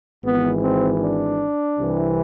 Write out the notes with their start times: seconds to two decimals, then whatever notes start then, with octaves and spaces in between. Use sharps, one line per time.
0.24 G#1 G#2 E3 B3
0.62 C4
1.01 D4
1.78 C2 C3 E3